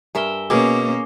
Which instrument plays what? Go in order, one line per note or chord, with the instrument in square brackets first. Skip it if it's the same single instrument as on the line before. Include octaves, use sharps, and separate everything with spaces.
[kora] G2 A#4 E5 [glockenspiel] G#5 G7
[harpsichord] B2 [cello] A#3 C#4 [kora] G#4 A#4 [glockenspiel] D6